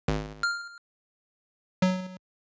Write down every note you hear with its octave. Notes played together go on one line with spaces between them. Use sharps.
G#1
F6
F#3